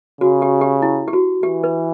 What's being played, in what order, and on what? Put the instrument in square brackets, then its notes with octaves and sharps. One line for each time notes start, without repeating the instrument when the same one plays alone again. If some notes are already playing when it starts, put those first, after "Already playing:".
[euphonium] C#3 [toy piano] F#4
[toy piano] G4
G4
E4
G4
F#4
[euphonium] E3 [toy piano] G4
[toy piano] B4